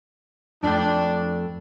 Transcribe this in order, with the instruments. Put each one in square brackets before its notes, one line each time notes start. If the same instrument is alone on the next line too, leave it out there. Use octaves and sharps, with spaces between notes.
[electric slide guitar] F2 A3 G5 [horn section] D4